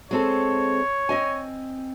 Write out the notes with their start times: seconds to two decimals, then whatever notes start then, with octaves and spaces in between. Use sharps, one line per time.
0.11 G#3 C4 A4 C#5
1.09 C4 D#5 G#5